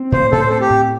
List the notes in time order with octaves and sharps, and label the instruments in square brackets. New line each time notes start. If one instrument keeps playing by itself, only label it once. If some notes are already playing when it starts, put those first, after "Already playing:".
Already playing: [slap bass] C4
[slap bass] A2 [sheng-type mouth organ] C5
[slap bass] A2 [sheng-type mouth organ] A4
[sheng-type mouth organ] C5
[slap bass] C4 [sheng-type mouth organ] A4
[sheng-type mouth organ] G4
[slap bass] A2